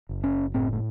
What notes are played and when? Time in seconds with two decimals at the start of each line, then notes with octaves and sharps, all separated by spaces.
0.09 F#1
0.24 C#4
0.54 A2 C4
0.73 A3